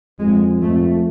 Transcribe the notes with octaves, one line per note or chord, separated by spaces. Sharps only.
F2 G#3
F2 A3